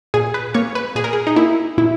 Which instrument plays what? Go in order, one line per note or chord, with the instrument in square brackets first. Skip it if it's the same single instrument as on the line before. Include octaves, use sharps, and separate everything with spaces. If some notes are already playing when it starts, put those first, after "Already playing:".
[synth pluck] A#2 G#4
B4
A#3 C#5
B4
A#2 G#4
A#4
G#4
D#4
A#3 E4
A#2 E4